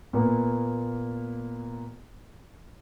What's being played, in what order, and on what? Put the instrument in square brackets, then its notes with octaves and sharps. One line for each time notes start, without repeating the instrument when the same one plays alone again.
[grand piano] A#2 A#3 B3